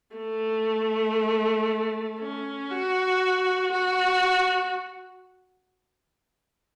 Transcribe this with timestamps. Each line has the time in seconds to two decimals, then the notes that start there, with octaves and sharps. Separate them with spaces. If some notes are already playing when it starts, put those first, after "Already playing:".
0.16 A3
2.19 C#4
2.71 F#4
3.72 F#4